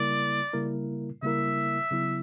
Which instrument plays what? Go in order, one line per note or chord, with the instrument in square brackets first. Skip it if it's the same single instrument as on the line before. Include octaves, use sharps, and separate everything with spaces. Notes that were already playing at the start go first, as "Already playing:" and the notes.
Already playing: [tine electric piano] C#3 G3 A#3 E4 A#4 [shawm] D5
[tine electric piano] C#3 G3 A#3 E4 A#4
[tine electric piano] C#3 G3 A#3 E4 A#4 [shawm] E5
[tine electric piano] C#3 F#3 B3 E4